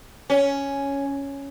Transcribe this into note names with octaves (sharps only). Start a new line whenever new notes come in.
C#4